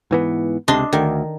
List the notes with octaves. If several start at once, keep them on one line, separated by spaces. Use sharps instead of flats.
G#2 E3 B3
C#2 C3 D4 D#5 C6
D2 D#3